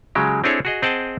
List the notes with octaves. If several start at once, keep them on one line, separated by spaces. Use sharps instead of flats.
C#3 F#3 G#3 G4
C4 D4 E4 G#4 A4 C#5
F#4 G#4 D#5
C4 G#4 D#5 F#5 G5 A5